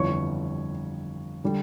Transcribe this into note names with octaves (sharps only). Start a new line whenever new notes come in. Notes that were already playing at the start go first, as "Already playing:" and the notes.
Already playing: G1 F2 E3 G3 C#5 C#6
D3 G3